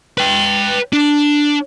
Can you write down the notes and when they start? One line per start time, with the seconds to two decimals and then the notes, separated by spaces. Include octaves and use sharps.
0.18 B4 G5
0.93 D4